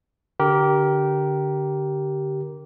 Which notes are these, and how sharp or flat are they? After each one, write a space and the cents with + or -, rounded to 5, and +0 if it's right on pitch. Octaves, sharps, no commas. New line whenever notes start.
D3 -10 G4 -15 A#4 +10